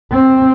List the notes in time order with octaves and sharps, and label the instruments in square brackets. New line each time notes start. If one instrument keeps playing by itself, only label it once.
[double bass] C4